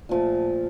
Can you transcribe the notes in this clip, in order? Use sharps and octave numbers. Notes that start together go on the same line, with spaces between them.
A#2 F3 A3